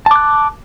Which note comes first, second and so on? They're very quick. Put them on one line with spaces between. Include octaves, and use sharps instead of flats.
A5 D6 F#6